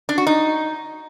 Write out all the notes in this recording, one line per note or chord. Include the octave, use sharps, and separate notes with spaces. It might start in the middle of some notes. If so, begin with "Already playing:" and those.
D4
F#4
D#4